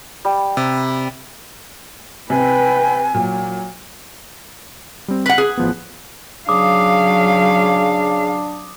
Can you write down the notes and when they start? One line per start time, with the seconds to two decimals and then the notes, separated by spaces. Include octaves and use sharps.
0.25 G3
0.57 C3
2.30 C3 B4 G5 G#5
3.14 A#2 F#3
5.08 G3 C4
5.26 B4 F#5 F#6
5.38 G#4 F#6
5.58 A1 F3 B3
6.49 C#3 F#3 D4 F5 D6 D#6